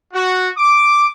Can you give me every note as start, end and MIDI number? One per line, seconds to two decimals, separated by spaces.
0.12 0.48 66
0.55 1.06 86